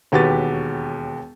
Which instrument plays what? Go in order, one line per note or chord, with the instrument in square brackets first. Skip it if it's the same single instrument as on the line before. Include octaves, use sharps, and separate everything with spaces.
[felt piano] E1 D#2 F#4 G4 B4 A6